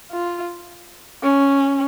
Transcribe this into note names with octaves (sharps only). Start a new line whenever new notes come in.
F4
C#4